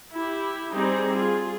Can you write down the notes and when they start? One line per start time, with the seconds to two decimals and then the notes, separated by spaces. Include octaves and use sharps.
0.12 E4 G4
0.73 G3 C4 D#4 G#4
1.15 F4 G#4